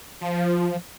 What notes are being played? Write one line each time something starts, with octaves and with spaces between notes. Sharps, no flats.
F3